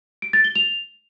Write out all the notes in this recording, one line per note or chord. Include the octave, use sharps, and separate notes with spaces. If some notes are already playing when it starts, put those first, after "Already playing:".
D7
A6
G7
F7